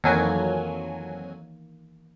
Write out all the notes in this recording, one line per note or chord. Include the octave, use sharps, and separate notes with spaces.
F2 D#3 E3 F#3 A#3 G#5